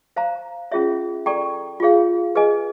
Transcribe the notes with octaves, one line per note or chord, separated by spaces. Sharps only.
C5 F5 A#5
C#4 F4 G#4 C#5 E5
A4 D5 G5 A#5 C#6
F4 G#4 C#5 F5
G#4 B4 D#5 G#5